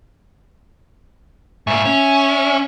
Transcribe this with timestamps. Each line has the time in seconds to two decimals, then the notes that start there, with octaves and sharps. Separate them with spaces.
1.67 G#2 A#3 E5 G#5 C#6
1.85 C#4